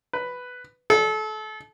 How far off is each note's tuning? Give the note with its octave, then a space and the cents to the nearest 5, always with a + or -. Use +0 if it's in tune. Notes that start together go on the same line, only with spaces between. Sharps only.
B4 +5
A4 -30